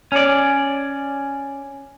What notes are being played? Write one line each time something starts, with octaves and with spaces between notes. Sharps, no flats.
C#4 D5